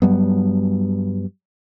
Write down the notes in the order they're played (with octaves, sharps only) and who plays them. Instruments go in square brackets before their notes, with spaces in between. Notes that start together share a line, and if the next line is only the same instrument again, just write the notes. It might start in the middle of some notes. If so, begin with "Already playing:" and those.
[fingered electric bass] G2 F#3 G3 B3